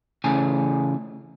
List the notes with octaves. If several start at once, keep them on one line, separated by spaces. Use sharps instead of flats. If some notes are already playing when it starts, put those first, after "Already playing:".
C#3 E3 A3 C#4 G#4 G#5